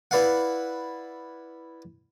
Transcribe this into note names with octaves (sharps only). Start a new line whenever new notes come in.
E4 B4 D5 F5 F#5